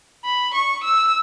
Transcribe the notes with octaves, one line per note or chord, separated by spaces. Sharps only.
B5
C#6
E6